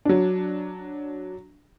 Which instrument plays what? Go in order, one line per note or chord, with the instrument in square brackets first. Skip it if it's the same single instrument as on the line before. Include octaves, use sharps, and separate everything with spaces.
[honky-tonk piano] F#3 D4